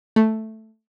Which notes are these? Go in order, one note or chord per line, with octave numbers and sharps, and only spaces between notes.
A3